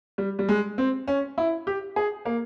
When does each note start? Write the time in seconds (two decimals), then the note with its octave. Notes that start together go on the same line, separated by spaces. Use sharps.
0.18 G3
0.39 G3
0.49 G#3
0.78 C4
1.08 C#4
1.38 E4
1.67 G4
1.96 G#4
2.25 A#3